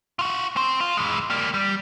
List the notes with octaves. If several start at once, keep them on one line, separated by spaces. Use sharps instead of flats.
F4 F#4
C4 C5
F4
E3 G#3
G3 A#3
G3